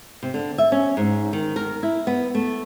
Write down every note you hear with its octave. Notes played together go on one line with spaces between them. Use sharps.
C3
D3
E5
C#4
G#2
D#3
A#4
E4
B3
A3